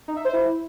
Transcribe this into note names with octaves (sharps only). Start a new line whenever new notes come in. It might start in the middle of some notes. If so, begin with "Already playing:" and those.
D#4
E5
C5
E4